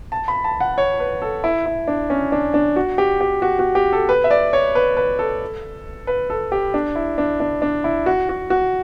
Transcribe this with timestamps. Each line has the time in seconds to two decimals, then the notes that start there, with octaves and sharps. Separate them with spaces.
0.12 A5
0.28 B5
0.44 A5
0.60 F#5
0.78 C#5
1.00 B4
1.22 A4
1.44 E4
1.66 E4
1.88 D4
2.10 C#4
2.32 D4
2.54 D4
2.76 F#4
2.98 G4
3.21 G4
3.42 F#4
3.59 F#4
3.75 G4
3.93 A4
4.09 B4
4.24 E5
4.31 D5
4.53 C#5
4.75 B4
4.97 B4
5.19 A4
6.07 B4
6.30 A4
6.52 G4
6.74 D4
6.96 E4
7.18 D4
7.40 D4
7.62 D4
7.84 E4
8.06 F#4
8.29 F#4
8.50 F#4